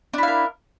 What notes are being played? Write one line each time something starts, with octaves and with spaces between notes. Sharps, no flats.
D4 E4 A#4 F5